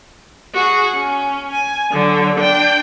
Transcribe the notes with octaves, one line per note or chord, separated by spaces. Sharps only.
F#4 G#4
C#4
G#5
D3 F#3
D4 G5